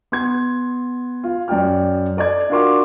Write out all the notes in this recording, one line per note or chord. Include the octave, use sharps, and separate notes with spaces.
B3 C6 G#6
F4
F#2 D5 G5 F6
A4 D5 D#5 G#6
D4 F4 F#4 A#4 C6 D6